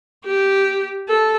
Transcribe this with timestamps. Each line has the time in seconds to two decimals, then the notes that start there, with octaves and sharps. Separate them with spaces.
0.25 G4
1.08 A4